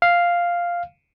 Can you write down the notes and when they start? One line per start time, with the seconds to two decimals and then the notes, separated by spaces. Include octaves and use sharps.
0.02 F5